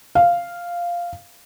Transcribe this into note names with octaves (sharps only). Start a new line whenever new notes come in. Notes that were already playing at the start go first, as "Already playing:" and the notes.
F5